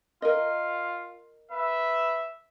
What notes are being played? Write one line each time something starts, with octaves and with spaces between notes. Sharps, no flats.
F4 A#4 D#5
B4 E5